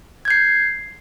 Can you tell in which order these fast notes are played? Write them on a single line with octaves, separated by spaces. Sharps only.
G#6 G6 C7